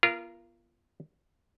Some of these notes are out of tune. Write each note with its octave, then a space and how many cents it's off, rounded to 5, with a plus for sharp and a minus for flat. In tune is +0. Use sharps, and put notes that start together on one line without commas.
B3 -30 F4 -25 A#4 +0